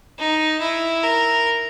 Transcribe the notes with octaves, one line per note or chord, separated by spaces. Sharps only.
D#4
E4
A#4